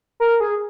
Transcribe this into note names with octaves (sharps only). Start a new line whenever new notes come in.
A#4
G#4